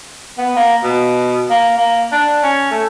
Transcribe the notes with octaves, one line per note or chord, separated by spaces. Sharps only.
B3
A#3
B2
A#3
A#3
D4
C#4
A3